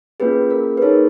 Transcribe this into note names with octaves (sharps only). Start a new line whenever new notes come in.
A#3 C#4 F4 G#4 B4
A#4
B4
A#3 D#4 G#4 A#4 C#5